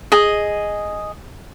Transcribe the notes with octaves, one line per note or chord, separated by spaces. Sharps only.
G#4 D#5